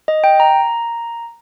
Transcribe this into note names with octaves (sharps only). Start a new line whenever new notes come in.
D#5
G5
A#5